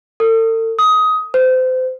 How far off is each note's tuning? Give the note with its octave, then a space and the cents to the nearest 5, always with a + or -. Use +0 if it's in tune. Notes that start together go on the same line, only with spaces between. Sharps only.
A4 +40
D#6 +15
C5 -30